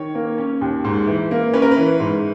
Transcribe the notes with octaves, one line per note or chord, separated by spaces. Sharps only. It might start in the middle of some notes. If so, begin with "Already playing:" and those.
Already playing: D#3 C#5
A#3
C#4
D#2
G#2
E3
A#3
C#4 B4
A#4
B4
E3
G#2